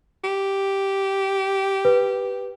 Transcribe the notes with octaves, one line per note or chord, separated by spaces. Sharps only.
G4
B4